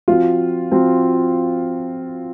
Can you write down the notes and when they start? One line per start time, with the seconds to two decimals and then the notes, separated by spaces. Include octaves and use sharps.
0.08 F3 C4 F4 F#4
0.72 F3 C4 F#4